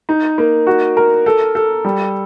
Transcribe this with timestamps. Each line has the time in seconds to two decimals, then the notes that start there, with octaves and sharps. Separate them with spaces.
0.09 D#4
0.38 A#3
0.67 F#4
0.97 A#4
1.26 A4
1.55 A4
1.85 G3